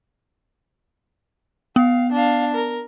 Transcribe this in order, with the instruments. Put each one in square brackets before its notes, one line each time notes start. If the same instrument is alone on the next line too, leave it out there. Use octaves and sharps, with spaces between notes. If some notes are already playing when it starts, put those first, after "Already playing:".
[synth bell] B3 [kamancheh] F5
[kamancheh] D4 F5
A#4